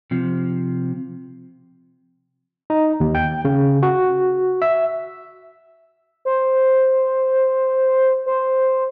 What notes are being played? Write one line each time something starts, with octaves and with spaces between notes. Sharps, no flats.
C3 F3
D#4
D#2
G5
C#3
F#4
E5
C5
C5